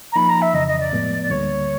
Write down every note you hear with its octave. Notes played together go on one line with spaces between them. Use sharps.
A#5
F3 A#3 D#4 B5
A#5
E5
F2 C#3 E3 D#5
D#5
D5
A2 F3 G#3 B3
D5
D2 D3 G3 A#3 C#5